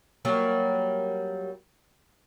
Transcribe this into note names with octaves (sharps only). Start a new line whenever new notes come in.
F#3 G3 A#3